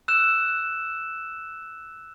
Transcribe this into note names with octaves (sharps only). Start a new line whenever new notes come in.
E6 F#6 E7